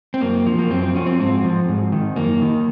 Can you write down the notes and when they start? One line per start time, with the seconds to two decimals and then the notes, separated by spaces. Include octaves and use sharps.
0.14 C4
0.21 F#2 A#3
0.47 F3
0.59 A#3
0.70 F#2 C4
0.83 C4
0.95 F3 C#4
1.07 C4
1.20 G#2 C4
1.44 F3
1.69 G#2
1.92 D#3
2.16 F#2 A#3
2.42 D#3